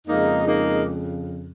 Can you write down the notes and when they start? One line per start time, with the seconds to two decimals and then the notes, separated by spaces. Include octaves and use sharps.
0.07 F2 C#3 G#3 A#3 D#4
0.46 A#3 D#4